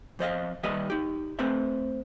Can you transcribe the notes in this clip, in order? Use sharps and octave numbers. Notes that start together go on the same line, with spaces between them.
F2 C5 D#5 F5
D#2 G3 B4 D#5 E5
D#4 G4
A3 C4 B4 C5 E5